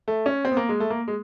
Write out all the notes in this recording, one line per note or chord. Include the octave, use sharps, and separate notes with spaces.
A3
C#4
C4
B3
A#3
G#3
A3
A#3
G#3